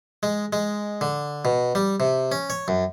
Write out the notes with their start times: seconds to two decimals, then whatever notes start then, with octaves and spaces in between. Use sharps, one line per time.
0.23 G#3
0.53 G#3
1.01 D3
1.45 B2
1.75 G3
2.00 C3
2.32 C#4
2.50 C#5
2.68 F#2